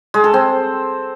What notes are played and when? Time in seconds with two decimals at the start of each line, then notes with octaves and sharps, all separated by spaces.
0.14 G#3
0.24 A4
0.34 C4